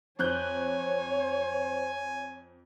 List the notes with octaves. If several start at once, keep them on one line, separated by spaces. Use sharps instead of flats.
F2 C5 C#5 G#5 F#6 G6